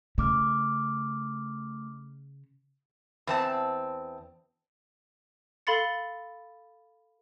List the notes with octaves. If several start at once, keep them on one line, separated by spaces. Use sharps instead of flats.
C#3 A3 D6 F6
E2 C4 A5
A4 F5 B5 C6 A6 C#7